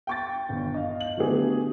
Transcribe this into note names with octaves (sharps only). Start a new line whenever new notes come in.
G5 C#6 A6
G1 D3
D#5 F5
F#7
D3 F#3 A3 B3 G4 G#4